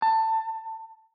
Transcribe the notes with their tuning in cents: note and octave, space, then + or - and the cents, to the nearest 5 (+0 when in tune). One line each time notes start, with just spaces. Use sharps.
A5 +20